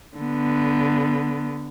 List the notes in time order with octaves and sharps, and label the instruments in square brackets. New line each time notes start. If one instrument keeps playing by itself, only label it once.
[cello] D3 B3